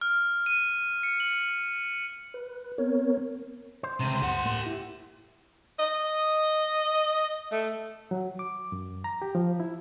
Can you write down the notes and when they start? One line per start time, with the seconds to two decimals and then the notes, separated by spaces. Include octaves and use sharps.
0.01 F6
0.46 D#7
1.03 C#7
1.20 F#7
2.34 B4
2.78 B3 C4 A#4 C#5
3.83 C5
4.00 C#2 C3
4.22 D2 G2 G4 F#5
4.44 A2 A#3
4.64 E4 G4
5.79 D#5
7.51 A3
8.11 F#3
8.39 D6
8.72 F#2
9.04 A#5
9.22 G4
9.35 F3
9.60 E4